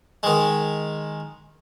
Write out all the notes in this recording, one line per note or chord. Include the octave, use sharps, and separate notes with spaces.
D#3 G#3